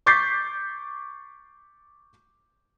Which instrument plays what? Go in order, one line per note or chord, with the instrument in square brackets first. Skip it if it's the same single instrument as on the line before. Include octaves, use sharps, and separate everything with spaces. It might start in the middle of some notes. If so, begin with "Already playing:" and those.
[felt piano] C#6 D6 G6 A6 B6 C7